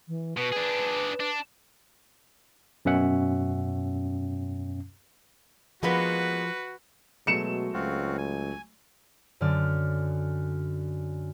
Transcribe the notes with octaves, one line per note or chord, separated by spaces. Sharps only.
E3
B2 B4
D4 G#4
D4
F#2 B2 C#4 E5 F#5
F3 G#3 A#3 B3 F#4 B4
B2 F#3 G#3 A3 C#7 E7
C#2 C4 F4 F#4
G#5
F#2 D3 D5 F6